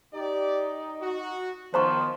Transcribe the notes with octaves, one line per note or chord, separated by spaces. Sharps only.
D#4 G4 D5
F#4
D#3 F3 B3 C5 A#5 C#6